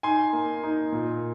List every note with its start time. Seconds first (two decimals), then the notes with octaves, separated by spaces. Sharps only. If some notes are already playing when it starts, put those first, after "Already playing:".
0.03 D#4 G#5 C6
0.33 A#3
0.64 D#4
0.92 A#2